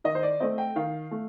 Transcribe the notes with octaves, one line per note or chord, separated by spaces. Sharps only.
D#3 D#5
C5
D5
A3 C4 D#5
G5
D#3 F5
A3